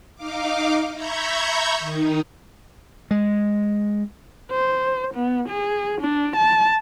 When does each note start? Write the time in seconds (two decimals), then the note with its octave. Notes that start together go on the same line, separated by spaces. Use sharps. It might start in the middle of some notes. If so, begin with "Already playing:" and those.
0.15 D#4 F5 D6
0.93 E5 A#5 B5 C#6 G6 G#6
1.79 D#3 D#4
3.11 G#3
4.51 C5
5.14 B3
5.49 G#4
6.01 D4
6.37 A5